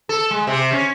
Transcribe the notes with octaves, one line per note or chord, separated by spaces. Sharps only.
A4
G#3
C3
C#4